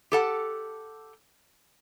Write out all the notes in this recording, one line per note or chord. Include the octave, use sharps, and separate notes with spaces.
G4 A4 F#5